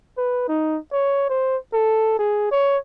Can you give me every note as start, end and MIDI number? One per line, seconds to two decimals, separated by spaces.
0.18 0.48 71
0.48 0.78 63
0.93 1.29 73
1.30 1.57 72
1.73 2.18 69
2.19 2.50 68
2.51 2.77 73